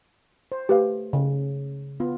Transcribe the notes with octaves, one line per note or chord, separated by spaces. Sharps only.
C5
A3 G4 B4 F5
C#3
B3 F4